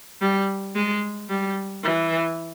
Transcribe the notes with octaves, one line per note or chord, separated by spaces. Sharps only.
G3
G#3
G3
E3